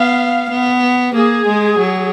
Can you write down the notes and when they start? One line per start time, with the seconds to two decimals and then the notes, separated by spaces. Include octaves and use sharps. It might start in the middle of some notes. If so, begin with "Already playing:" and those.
Already playing: B3 F5
0.50 B3
1.15 A#3 G#4
1.47 G#3
1.79 F#3